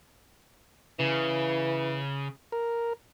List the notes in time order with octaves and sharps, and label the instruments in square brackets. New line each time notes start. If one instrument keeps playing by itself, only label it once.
[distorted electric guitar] C#3 [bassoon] E3
[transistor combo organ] A#4